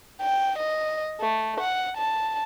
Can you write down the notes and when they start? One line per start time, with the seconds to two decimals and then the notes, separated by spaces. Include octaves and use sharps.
0.21 G5
0.58 D#5
1.20 A3
1.60 F#5
1.97 A5